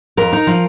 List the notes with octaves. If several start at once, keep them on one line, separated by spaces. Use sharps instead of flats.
F2 A#4
D#4
F3